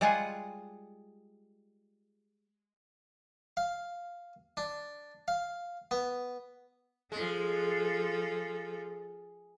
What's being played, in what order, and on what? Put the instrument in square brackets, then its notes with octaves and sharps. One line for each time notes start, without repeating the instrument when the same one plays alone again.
[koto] G3 G#3 F4 G#4 F#5 G#5
[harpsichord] F5
D4
F5
B3
[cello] F3 A4 [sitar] G#3